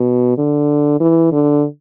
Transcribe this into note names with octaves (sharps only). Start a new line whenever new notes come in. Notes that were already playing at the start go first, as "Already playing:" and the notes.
Already playing: B2
D3
E3
D3